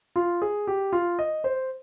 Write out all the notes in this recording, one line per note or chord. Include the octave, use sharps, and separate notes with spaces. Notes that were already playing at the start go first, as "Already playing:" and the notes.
F4
G#4
G4
F4
D#5
C5